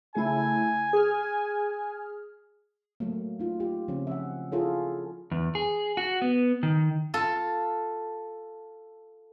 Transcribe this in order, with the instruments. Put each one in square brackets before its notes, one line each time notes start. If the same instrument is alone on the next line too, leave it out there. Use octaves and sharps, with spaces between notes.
[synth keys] C#3 A3 E4 [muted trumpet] G#5
[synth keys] G#4 F6
[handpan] F#3 A3 A#3
D#4 F4
F4 G4
C#3 F3 C4 C#4
E5 F#5
E4 F4 G#4 A4 C#5
[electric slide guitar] E2
G#4
F#4
B3
D#3
[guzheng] F4 A4